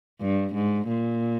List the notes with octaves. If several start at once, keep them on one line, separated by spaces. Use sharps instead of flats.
G2
G#2
A#2